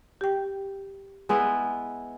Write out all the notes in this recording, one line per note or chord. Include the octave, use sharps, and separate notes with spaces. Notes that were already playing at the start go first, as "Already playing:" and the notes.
G4 G5
G#3 B3 E4